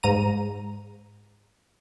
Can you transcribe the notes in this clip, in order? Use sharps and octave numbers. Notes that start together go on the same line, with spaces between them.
G#2 A#5 D#7